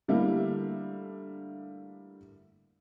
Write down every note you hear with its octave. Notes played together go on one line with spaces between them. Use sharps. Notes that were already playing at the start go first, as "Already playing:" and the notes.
D3 G3 A3 A#3 E4